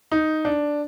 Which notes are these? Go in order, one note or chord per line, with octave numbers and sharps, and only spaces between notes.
D#4
D4